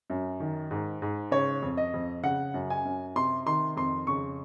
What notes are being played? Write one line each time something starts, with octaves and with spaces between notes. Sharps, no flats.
F#2
D#3
G#2
G#2
C#3 C#5
F2
D#5
F2
C#3 F#5
F#2
G#5
F#2
C3 C6
D#3 C6
F2 C6
C#3 C#6